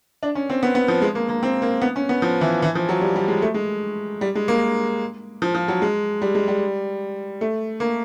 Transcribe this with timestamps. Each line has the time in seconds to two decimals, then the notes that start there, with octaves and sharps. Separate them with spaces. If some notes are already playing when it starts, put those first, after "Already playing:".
0.23 D4
0.35 C#4
0.50 C4
0.63 B3
0.75 B3
0.88 F3
1.02 G#3
1.15 A#3
1.29 A#3
1.43 C4
1.62 A#3
1.82 B3
1.96 C#4
2.09 B3
2.22 F3
2.41 E3
2.62 E3
2.75 F3
2.89 F#3
3.01 G3
3.16 G3
3.28 G#3
3.42 A3
3.54 G#3
4.21 G3
4.35 G#3
4.48 A#3
5.42 F3
5.54 F3
5.68 F#3
5.82 G#3
6.22 G3
6.35 G#3
6.48 G3
7.41 A3
7.80 A#3